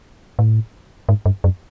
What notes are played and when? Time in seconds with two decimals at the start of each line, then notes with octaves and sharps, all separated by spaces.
0.39 A2
1.09 G#2
1.26 G2
1.44 F#2